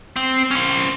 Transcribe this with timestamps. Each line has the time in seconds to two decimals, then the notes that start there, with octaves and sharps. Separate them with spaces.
0.16 C4
0.51 C#4 C5